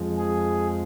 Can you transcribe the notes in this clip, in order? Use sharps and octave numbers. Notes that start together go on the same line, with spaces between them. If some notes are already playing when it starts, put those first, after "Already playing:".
Already playing: F2 F3 G#3
G#4